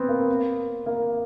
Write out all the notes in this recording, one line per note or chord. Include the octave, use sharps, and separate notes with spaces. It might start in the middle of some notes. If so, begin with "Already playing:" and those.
Already playing: B3 C4
A#3
A#3